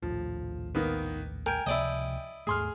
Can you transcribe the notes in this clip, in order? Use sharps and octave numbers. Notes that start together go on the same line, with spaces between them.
A#1 D#2 A2 F3
D#3 A#3 B3
A#4 G5 G#5
C#2 C3 F3 E4 D5 D#5
D#2 G#2 A3 G#4 C6 F6